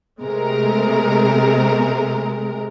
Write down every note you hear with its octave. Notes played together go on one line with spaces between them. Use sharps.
C3 G#3 A3 A#4